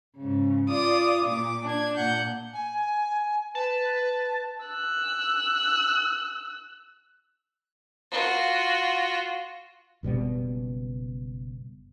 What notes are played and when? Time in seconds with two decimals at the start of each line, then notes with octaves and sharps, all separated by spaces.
0.17 G#2 C#3
0.69 F4 D5 D6 D#6
1.25 A#2 D6
1.64 D4 G#6
1.96 A#2 F#5 G6
2.53 G#5
3.55 B4 A5
4.66 E6 F#6
8.11 F4 F#4
10.03 F#1 B2 G3 B3